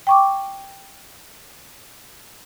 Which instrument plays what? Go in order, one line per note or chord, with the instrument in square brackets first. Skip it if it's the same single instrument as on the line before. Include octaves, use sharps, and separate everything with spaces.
[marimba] G5 C#6 D6